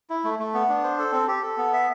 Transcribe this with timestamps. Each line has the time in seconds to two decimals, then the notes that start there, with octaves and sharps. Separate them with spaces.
0.10 E4
0.24 A3
0.39 A3
0.54 B3
0.69 D4
0.83 C5
0.99 A4
1.13 C4
1.28 G4
1.43 A4
1.57 B3
1.73 E5